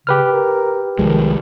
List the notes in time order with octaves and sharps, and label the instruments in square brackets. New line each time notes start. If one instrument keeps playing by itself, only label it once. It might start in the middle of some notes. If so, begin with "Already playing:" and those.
[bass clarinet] C#3 [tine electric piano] G4 B4 F6
[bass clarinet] A#4
[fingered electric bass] C2 F3 G#3 [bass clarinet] D#3